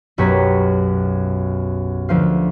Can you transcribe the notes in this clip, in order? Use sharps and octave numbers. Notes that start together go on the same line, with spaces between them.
B1 F#2 G4 C#5 A#5 B6
D2 F3 C5 F5